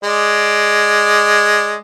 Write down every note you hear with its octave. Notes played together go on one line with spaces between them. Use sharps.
G#3 D5